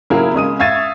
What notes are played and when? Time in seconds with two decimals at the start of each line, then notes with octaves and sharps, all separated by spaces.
0.10 C#3 F#3 A#3 E4 G#4
0.34 C#3 G#3 D#6 D#7
0.60 E5 F5 C#6 G#6 A6 D#7